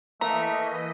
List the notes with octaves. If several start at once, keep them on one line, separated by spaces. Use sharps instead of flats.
E3 A3 A#3 D#5 A#5 B6